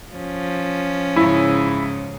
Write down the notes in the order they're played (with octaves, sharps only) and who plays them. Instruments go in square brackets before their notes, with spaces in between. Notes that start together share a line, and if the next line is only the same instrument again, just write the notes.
[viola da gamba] F3 C#4
[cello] G#2 C#3 [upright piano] E4